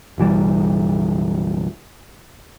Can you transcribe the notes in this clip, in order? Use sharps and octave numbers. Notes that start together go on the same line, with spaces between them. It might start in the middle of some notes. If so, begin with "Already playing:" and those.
F#1 B1 E3 G3